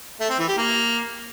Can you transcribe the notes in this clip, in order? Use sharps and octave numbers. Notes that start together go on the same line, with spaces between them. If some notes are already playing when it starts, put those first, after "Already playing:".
A3
C4
E3
G4
A#3